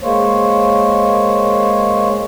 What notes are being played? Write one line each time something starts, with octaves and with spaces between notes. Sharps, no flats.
G#3 A#3 C5 C#5